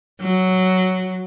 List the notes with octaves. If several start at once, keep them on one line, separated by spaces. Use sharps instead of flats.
F#3